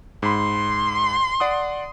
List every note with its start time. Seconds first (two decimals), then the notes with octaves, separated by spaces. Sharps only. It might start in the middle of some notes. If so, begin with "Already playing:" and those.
0.23 G#2 B5 C6
1.40 D5 F#5 D#6